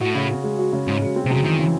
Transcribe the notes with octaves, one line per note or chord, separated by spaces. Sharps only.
A2 F#4
C#3
C#4
G#3
F#4
C#3
G#2 C#4
G#3
C4
C3
F#2 C#3
D#3 E3
C#3